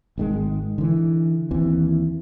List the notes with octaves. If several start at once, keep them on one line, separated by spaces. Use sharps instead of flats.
G#1 D#3 G#3
D3 E3
D#2 E3 C4